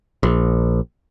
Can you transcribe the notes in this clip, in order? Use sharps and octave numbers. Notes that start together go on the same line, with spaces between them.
A#1